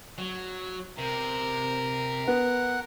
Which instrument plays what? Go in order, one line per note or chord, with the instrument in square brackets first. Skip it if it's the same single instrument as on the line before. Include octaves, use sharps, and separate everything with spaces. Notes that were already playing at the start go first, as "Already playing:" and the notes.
[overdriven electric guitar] F#3
[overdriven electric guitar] C3 [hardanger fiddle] A#4
[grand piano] B3 [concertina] F#5